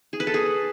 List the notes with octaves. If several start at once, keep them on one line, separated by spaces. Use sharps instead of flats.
G#4
B4
A4
G#4